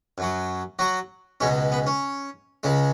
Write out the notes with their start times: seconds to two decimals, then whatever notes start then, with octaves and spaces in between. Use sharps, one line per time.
0.18 F#2 F#3
0.79 F#3 F#4
1.40 C#2 B2 G#3 C#4
1.72 B3
1.87 C#4
2.63 C#2 C#3 G#3